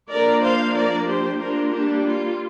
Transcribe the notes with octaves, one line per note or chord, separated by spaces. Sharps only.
F3 A#3 D4 A#4 D5
C5 F5
A#4 D5
G4 C5
G3 A#3 D4 F4 A#4
D4 G4
F4